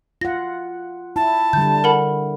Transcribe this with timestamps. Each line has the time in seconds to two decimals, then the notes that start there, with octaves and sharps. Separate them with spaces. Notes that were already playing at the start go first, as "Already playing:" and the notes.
0.21 F4 F#5 A#6
1.16 E4 A5
1.53 D3 G3 G6
1.84 A#4 F#5 B5